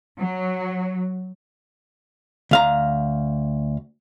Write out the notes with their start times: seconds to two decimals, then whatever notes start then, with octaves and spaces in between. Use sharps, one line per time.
0.19 F#3
2.51 D2 F5 A#5